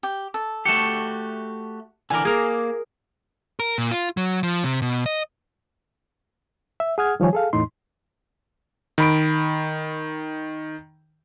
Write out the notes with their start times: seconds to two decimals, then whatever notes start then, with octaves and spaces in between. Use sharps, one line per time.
0.03 G4
0.34 A4
0.65 A3 F#4 G4 C#7 E7
2.10 D3 E3 A#4 G#5 D6
2.25 A#3 G#4 A#4
3.60 A#4
3.78 A#2
3.91 F4
4.17 F#3
4.43 F3
4.64 C3
4.82 B2
5.06 D#5
6.80 E5
6.98 G#4 F#5 D#6 F6 G#6
7.20 D#3 F3 G3 C#5 G#5
7.33 G#4 A4 F5
7.53 E2 A2 D#4 C6
8.98 D#3 B5 D7